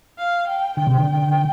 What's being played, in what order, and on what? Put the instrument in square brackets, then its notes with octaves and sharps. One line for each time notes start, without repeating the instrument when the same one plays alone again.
[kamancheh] F5
G5
[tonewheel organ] D3 [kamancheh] G5
[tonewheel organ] C3
D3